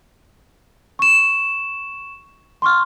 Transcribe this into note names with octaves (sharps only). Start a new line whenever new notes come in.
C#6 E7
C6 C#6 F6